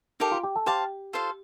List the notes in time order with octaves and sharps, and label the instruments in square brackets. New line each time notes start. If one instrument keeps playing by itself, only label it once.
[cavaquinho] D#4 G4 A#4 F5 [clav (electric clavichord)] A4
[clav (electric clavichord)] F4
G4
A4
[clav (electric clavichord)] G4 [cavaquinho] C5 F5 A5
[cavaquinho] F4 A4 C5 F5